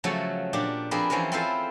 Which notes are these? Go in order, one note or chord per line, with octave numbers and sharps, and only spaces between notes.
C#3 F3 F#3 A3 A4 C#5
A#2 D4 G4
F3 C4 D4 G#4 A#4 B4
E3 F3 C4 C#4 A#4
C4 E4 F4 A4 B4 C5